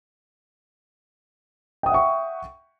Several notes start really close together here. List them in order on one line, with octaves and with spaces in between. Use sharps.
G5 D#6 F#5 E5 C#6